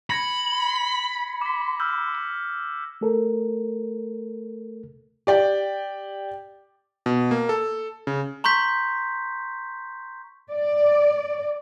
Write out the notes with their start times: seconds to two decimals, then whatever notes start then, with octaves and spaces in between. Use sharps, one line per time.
0.10 B5 G#6 A#6 C#7
1.41 D6 B6
1.80 E6 F6 G6
3.01 A3 A4 A#4
5.27 G4 D5 G5
7.06 B2
7.31 A#3
7.49 A4
8.07 C#3
8.44 A#5 C6 C#6 G6 B6
10.51 D5